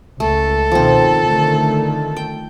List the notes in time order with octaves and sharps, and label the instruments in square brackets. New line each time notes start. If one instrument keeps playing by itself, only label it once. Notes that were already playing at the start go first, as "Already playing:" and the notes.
[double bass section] C#2 [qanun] A3 [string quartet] A4
[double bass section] B2 D#3 [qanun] F3 C4
[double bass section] D3 D#3 A3
[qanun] G5